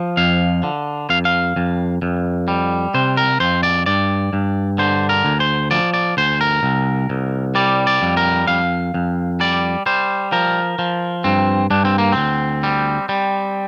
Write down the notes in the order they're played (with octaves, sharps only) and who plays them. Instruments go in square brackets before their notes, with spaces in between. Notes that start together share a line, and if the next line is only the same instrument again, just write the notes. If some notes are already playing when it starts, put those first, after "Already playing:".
Already playing: [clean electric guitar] F3
F2 F5
D3
F2 F5
F5
F2
F2
G3
C3 C5
A#4
F2 C5
D5
G2 D5
G2
D3 C5
A#4
D2
C5
F3 D5
D5
D2 C5
A#4
C2
C2
G3 D5
D5
F2
A#4
F2 F5
F2
G3 D5
G3 C5
F3 A#4
F3
G2 C4
G2 D4
C4
A#3
D2 C4
G3
G3